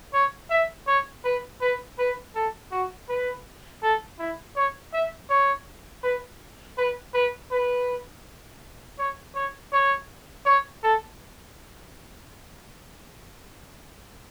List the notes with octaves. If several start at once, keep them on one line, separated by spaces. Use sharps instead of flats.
C#5
E5
C#5
B4
B4
B4
A4
F#4
B4
A4
E4
C#5
E5
C#5
B4
B4
B4
B4
C#5
C#5
C#5
C#5
A4